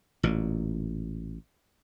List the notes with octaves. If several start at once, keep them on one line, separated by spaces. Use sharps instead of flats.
A1 A#2